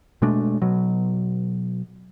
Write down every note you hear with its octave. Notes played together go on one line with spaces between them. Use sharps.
B2 G#3 A3 D4
B2 F#3